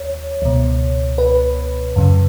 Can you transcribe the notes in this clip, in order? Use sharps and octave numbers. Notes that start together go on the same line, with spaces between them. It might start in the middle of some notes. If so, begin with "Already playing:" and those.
Already playing: D#2 C#5
C#2 B2
B4
F#2 C#3